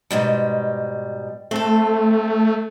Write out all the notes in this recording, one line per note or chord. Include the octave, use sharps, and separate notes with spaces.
G#2 B2 G3
A3 C4 A4